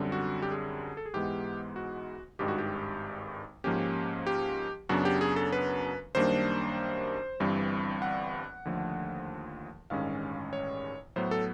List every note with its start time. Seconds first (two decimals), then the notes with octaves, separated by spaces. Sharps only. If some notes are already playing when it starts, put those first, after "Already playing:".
Already playing: F#2 D3 G3 C4
0.12 F#4
0.42 G4
0.51 G#4
0.97 A4
1.06 G#4
1.14 G#2 E3 G#3 B3 G4
1.76 F#4
2.39 G#1 G2 D#3 G#3 G4
2.48 F#4
2.58 G4
3.64 G#2 F3 A#3 C#4 G4
4.27 G4
4.89 F#2 C#3 F#3 B3 D4 F#4
5.05 G4
5.21 G#4
5.36 A4
5.52 B4
6.15 F#2 D#3 G3 A#3 D4 C5
7.40 G1 G2 E3 G3 C4
8.02 F#5
8.65 D#2 D3 F3 A3
9.90 A1 G2 D#3 G#3 C#4 F5
10.53 C#5
11.16 A2 F#3 B3 C5
11.31 A4